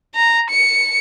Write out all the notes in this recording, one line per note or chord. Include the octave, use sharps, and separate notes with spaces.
A#5
C#7